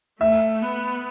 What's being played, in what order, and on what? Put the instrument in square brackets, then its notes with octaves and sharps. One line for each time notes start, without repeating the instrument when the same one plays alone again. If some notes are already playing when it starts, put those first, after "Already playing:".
[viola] A3 [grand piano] E5
[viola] B3